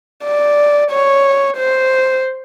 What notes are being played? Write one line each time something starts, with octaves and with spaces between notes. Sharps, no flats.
D5
C#5
C5